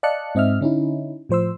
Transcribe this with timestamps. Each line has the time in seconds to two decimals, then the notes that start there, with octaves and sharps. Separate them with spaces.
0.03 D5 D#5 F5 A5 F#6 C#7
0.35 G#2 C4 D#5 E5 F6
0.61 D3 C#4 D#4 E4
1.29 A2 F3 C5 C6 E6